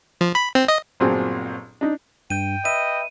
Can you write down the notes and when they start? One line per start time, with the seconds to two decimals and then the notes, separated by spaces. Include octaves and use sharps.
0.21 F3
0.35 B5
0.55 C4
0.68 D#5
1.00 G1 A#2 F#3 C4 G#4 A5
1.81 D4 D#4
2.30 G2 G5 G6 D#7
2.65 B4 D#5 E5 D#7